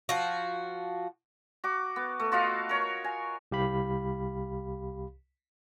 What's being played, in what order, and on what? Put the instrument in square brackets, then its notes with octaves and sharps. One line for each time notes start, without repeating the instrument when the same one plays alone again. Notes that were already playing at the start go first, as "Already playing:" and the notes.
[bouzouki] F3 F#4
[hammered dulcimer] F#4 D6
B3
A3
F4 F#4 D#5 F5
A#4 C#5
G#5
[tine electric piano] C2 G4 F5 B5